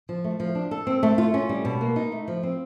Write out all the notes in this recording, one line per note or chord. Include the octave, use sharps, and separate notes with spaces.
F3
A3
F3
D4
A4
C4
A3
F4
C#4
G3
B2
A#3
D#4
A3
F3
C4